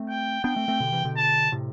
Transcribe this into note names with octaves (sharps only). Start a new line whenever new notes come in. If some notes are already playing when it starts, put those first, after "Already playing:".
Already playing: A3 C4
G5
B3 D4 G5
A3 C4
A3 C4
B2 D3
C3 E3
B2 D3
A5
A2 C3